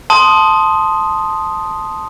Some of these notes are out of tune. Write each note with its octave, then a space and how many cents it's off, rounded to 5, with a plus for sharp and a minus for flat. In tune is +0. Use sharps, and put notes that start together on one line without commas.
A5 +0 C6 +0 D#6 +0